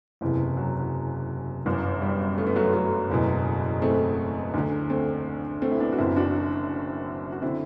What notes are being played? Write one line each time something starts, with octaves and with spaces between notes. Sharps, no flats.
F#1 E2 C3 E3
F#3
G1 F#2 E3
G3
A3
B3
F#3 A3
F#3 A3
F#1 E2 B2
A3 C4
D2 D3
A3 C4
A3 C4
E4
B3 D4
F#4
F#1 F#2 E3 C4 E4
D4 F#4
F#4
D3 C4 E4